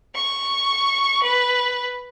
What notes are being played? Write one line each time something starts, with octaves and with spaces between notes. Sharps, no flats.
C#6
B4